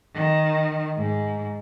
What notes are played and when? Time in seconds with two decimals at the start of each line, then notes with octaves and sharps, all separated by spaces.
0.15 D#3
0.97 G#2